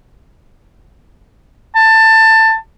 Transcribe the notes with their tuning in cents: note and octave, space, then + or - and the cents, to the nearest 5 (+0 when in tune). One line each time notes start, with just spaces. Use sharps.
A5 +20